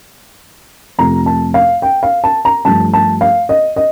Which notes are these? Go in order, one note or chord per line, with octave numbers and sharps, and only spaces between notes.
F2 C3 F3 A3 A#5
A5
F5
G5
F5
A5
A#5
G2 F3 A3 A5
A5
F5
D#5
D#5